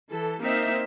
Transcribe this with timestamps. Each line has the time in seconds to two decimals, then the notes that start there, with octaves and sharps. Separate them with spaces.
0.11 E3 A4
0.41 A#3 C4 D#4 E5